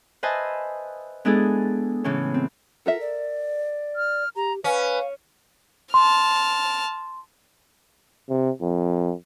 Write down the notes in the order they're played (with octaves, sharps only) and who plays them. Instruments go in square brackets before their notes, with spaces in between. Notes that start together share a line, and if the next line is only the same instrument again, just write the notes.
[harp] B4 C5 D#5 E5 G#5 A5
G#3 B3 D4 E4 G#4 A4
A2 C#3 E3 B3 C#4
C4
[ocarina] F4 [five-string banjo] A4 A#4 E5
[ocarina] D5
[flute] F6
[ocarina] G4 [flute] A#5
[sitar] C#4 [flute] B4 [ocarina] F5
[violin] A5 F6 [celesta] C6
[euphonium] C3
F2